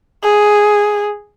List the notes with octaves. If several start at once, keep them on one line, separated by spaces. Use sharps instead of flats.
G#4